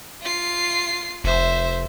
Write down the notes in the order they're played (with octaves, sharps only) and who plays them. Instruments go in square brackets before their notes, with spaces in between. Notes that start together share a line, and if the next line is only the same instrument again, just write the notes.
[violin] F4 C7
[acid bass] F1 [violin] C5 E5